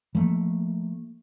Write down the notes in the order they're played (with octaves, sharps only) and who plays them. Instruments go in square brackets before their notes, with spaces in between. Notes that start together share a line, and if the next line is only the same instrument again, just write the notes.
[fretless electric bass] F3 G3 A3 A#3